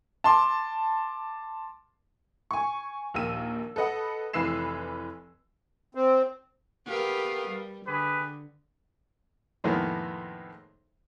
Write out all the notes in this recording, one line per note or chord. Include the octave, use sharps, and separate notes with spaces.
A5 C6 D6
G#5 C#6
A#1 D#2 A#4 G5 E6 D#7
A4 B4 D#5 F#5
F1 E3 B4 E6 C7 E7
C4
A3 B3 G4 A#4 B4 F5
G3
D3 G4 G#4 B4
F2 A2 D#3 G#3 A#3 B3